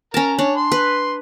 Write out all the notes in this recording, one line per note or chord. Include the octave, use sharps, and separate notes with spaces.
C#4 A#4 A5 A#5
D4 C#5
C6
B4